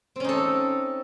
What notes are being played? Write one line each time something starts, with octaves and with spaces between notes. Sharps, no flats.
C4 C#4 D#4 A4